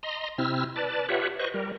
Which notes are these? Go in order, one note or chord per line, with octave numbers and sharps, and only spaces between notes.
D#5 A#5 C6
C3 C4 E4 E6 F6
B4 D5 A5
F4 G4 B4 C#5 E5 F#5
B4 C5 D#5 C#6
G3 A#4